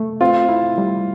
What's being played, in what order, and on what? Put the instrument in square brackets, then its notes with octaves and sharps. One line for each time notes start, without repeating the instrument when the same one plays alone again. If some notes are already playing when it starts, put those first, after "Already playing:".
Already playing: [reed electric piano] A3
[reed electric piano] C4 [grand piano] F4
[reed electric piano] E4
G3